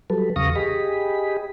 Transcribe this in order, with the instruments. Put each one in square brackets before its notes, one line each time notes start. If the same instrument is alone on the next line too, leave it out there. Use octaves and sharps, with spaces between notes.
[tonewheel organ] F#3 G3 A4 B4
E2 C#3 F5 C#6 D#6 A#6
G4 G#4 D#5 B5